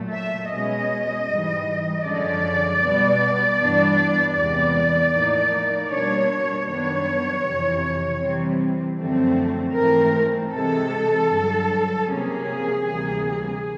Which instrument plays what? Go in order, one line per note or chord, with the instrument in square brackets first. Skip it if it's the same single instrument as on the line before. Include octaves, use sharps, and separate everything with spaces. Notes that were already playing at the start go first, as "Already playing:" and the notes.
Already playing: [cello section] A#2 F#3 A3
E5
B2 G#3 C#4 D#5
G#2 E3 G3
F#2 D3 F3 G#3 C#4 D5
B2 G3 B3
G2 E3 G3 B3 D4
E2 C3 E3 G#3 B3 D5
A2 F3 A#3 D#4
B2 G3 A#3 D4 C#5
F#2 D#3 G3 B3 D4 C#5
F2 C3 E3
C3 E3 G3 C4
F#2 D3 F3 A3 C4
G#2 E3 A3 C4 A#4
C3 E3 G#3 A4
G2 D3 F#3
C3 F3 A#3 C#4 G#4
D2 C3 E3 G3 A#3